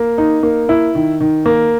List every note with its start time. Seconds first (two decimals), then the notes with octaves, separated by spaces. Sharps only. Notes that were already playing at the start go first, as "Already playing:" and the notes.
Already playing: A#3
0.18 D#4
0.43 A#3
0.69 E4
0.95 D#3
1.20 D#3
1.46 A#3